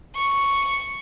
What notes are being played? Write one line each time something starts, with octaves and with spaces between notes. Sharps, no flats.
C#6